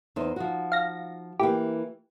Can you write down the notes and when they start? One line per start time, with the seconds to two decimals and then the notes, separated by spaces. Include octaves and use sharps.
0.16 E2 D#4 C5
0.36 F3 D#4 F#4
0.72 F5 A#6
1.39 E3 A#3 E4 G4